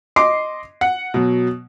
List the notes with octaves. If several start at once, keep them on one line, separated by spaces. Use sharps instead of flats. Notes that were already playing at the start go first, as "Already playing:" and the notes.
D#5 C6 D6 C7
F#5
B2 F#3